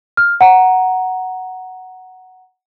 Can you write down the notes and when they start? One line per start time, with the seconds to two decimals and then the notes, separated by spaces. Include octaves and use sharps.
0.17 F6
0.41 F#5 A#5